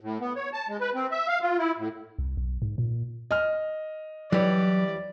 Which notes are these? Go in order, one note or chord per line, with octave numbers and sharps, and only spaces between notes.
A2
B3
C#5
A5
G#3
B4
C4
E5
F5
F4
E4
A2
C2
B1
G#2
A#2
D#5 F6
E3 F#3 G3 C#5 D5